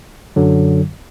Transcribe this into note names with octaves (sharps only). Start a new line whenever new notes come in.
F#2 D3 F#3